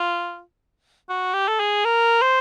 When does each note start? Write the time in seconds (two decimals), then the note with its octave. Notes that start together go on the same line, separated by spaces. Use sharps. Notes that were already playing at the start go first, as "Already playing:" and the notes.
Already playing: F4
1.09 F#4
1.34 G4
1.48 A4
1.60 G#4
1.85 A#4
2.22 C5